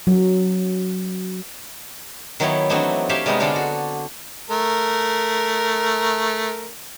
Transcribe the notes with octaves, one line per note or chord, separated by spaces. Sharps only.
F#3
D#3 F#3 B3 E4 B4 C#5
E3 F#3 A3 C4 D4 D#4
G4 C#5 E5 F5 G5 A5
C3 G3 G#3 B3 D#4
D3 G#3 D4 F4 A4 D5
F#4
A3 A#4